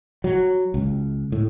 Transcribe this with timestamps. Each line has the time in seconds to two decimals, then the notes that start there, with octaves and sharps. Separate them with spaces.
0.24 F#3
0.74 C#2
1.32 A2